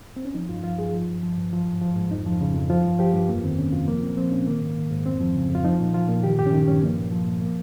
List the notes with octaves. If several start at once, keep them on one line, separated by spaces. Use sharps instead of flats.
C4
C#4
F3 D#4
G2 F4
F3 F4
G2 G#4
F3
G2
F3
G2
F3
G#2
F3
G#2
F2 D#4
F3
C#3
F2
F3 F4
G2
F3 G4
G2
F2 A#3
D#3 C4
C3 C#4
F2 F4
F3 A#3
A#2 C4
F3 C4
A#2 C#4
D#3 A#3
G#2
D#3
G#2
F2 C4
F3
C#3
F2
F4
F3 D#4
A#2
F3 F4
A#2
D#3 G4
G2 G4
C#4
D#3 D#4
G2 C#4
F3 A#3
A#2
F3
A#2
F3 A#3